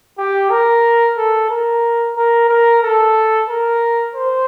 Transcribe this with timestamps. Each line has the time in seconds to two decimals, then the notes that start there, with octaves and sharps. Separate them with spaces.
0.18 G4
0.50 A#4
1.17 A4
1.50 A#4
2.16 A#4
2.49 A#4
2.83 A4
3.48 A#4
4.15 C5